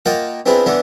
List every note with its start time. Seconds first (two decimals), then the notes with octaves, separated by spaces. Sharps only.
0.06 A#3 F4 D#5 F#5 G5 A5
0.46 B3 C4 D4 E4 F4 G#4
0.66 D3 E3 B3 D4